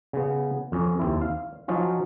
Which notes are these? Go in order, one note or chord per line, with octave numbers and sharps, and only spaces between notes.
C#3 B3
F2 C#4
D#2 C4 E4
F5
F3 F#3 C#4 D#4 F4